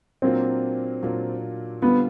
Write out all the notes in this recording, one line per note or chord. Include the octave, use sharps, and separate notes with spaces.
A#2 F#3 A#3 C4 D4 F4
A#2 F#3 A#3 D4 F4
D3 G3 B3 C4 F4